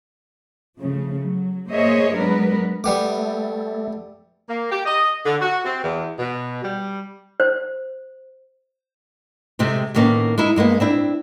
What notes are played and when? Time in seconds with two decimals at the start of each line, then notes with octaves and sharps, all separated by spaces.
0.79 C#3 F3 A3
1.22 F#3
1.71 A#3 G#4 C5 C#5 D#5 E5
2.15 F#3 G#3 B3 D4 A#4 B4
2.84 G3 A3 B3 D6
4.48 A#3
4.71 G4
4.86 D#5
5.25 D3
5.41 F#4
5.66 C4
5.84 E2
6.18 B2
6.63 G3
7.40 C5
9.59 C3 G#3 A3 C4
9.95 A2 D#3 A#3 B3 C#4
10.38 G#3 D#4 E4
10.56 G2 G#3 A#3 B3
10.80 C4 D4 E4